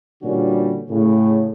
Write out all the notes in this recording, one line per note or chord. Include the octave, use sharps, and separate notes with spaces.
A#2 D3 E3 G3 C#4 F#4
A2 C#3